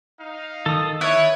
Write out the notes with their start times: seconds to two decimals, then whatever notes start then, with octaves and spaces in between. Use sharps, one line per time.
0.20 D#4 F5
0.66 D#3 A4 D#6
1.01 E4 B4 C#5